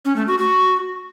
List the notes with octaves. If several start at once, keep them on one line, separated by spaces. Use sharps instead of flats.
C#4
A3
F#4
F#4